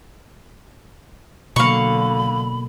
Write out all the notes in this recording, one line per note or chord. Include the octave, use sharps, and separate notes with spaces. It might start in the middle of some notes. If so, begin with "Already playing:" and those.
B2 D3 F#3 A#3 F5 B5 C#6